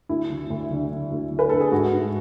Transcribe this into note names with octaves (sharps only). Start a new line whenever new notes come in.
D2 E4
D3
D2
D3
D3
D2
D3
B4
D2 A4
G#4
G#2 F#4
G#2